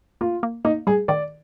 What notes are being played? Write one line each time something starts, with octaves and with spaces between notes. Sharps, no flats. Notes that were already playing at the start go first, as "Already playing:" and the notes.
A#3 F4
A#3
A#3 D#4
G3 G#4
D#3 D5